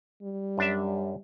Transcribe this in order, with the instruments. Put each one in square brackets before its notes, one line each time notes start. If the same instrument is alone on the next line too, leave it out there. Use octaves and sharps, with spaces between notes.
[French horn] G3
[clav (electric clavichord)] F#2 D4 E5